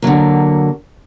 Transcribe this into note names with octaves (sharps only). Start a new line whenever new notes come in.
D3 F#3 A#3